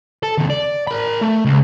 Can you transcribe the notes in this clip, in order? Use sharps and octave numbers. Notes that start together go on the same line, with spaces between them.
A4
D#2 C3
D5
A#4 B5
A3
C#2